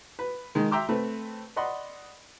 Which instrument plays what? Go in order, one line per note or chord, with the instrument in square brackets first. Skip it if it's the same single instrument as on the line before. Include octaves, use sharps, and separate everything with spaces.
[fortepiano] B4
D#3 G#3
E5 G5 A#5 C6 D6 E6
A3 C4 B4
D5 D#5 F#5 B5 C6